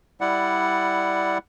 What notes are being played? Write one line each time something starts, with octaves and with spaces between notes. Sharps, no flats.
G3 E4 D5 F#5